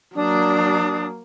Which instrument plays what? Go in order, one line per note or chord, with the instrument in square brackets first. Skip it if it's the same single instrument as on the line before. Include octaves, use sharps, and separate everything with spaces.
[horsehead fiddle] F#3 A#3 [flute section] D4 D#6